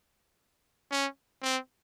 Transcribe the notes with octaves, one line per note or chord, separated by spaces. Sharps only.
C#4
C4